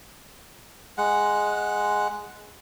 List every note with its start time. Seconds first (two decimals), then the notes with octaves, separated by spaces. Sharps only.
0.98 G#3 F#5